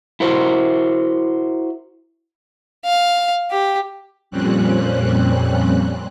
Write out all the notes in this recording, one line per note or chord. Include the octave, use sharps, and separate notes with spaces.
E4 F#4 A#4 C5
F5
G4
F2 A#2 G3 C4 C#4 F#6